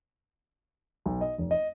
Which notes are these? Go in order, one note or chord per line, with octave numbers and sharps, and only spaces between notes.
B1
D#5
F1
D#5